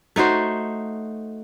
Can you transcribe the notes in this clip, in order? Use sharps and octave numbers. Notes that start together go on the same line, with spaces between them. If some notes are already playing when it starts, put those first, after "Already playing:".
A3 D#4 F#4 C5